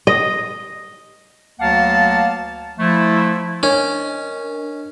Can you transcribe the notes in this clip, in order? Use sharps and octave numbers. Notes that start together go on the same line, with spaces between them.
D#5
D2 F#3 A#3 F5 F#5 A5
F3 A3 E4
C#4 D4 A#4 D#5